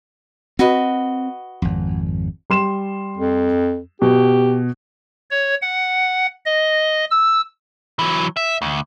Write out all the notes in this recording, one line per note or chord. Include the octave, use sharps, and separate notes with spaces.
C4 F#4 B4 D#5
G#1 F2
G3 C6 E7
F2
B2 G4
C#5
F#5
D#5
E6
E3 F#3
E5
D2